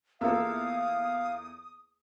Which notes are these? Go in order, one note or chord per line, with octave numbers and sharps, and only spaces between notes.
E2 A#3 F4 A4 E5 F5 D#6 E6